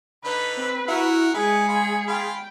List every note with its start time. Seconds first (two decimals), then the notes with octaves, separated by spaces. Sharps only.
0.25 D3 D#4 B4 B5
0.57 C4
0.88 E4 F#4 A#4 F#5 E6
1.34 G#3 E4 G#4 B4 C#7
1.68 F4 B5
2.08 F4 F5 G5 B5